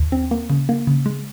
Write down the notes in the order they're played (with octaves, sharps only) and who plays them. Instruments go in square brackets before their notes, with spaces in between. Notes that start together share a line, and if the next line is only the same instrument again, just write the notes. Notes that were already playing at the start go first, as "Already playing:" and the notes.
Already playing: [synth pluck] D#2
C4
A#3
C#3
A#3
C#3
G#3